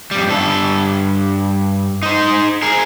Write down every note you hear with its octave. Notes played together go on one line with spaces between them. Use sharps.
F2 G3
G2 A4
D#4 C5
G#4 A#4